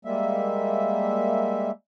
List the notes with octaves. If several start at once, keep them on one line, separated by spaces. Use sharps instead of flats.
G3 G#3 A#3 E5